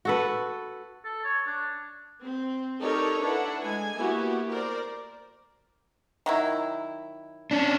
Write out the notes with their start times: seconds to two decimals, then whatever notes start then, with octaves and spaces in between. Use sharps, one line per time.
0.05 F#4 A4 B4
1.04 A4
1.24 C#5
1.46 D4
2.22 C4
2.80 D#4 G4 A4 A#4 C#5 D5
3.21 D4 E4 A4 B4 F#5
3.63 G#3 G#5
3.96 A#3 B3 E4 F#4 G4
4.50 A#4 C5 D5
6.26 D#3 F#3 E4
7.51 C#4 D4